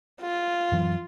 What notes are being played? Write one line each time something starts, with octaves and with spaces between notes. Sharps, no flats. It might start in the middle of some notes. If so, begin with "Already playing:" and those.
F4
F#2 E3 F#3